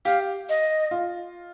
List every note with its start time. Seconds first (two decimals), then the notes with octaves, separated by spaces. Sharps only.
0.05 G4 F5
0.49 D#5
0.91 F4